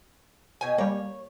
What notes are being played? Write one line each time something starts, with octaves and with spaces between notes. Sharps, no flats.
B2 G5 G#5
G3 A#3 C#5